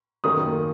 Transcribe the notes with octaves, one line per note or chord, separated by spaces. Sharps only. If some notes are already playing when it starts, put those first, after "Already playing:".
F#2 D#3 A#3 D#6